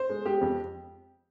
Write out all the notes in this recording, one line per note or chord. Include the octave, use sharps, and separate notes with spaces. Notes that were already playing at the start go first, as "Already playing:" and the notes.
Already playing: C5
G#3
G#3 G4
F2